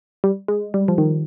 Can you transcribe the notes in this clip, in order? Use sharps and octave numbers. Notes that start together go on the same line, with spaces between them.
G3
G#3
G3
F3
D#3